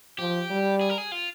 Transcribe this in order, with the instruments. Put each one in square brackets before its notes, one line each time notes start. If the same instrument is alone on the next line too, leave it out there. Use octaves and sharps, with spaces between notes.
[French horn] F3 [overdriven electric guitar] G4
[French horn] G3
[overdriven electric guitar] G#4
A#4
G#4
F4